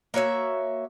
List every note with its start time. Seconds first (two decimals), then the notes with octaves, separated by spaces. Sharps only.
0.14 A#3 F#4 C#5 E5